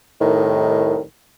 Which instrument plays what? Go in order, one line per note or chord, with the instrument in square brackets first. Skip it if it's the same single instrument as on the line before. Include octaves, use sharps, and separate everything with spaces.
[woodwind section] C2 A2 D#3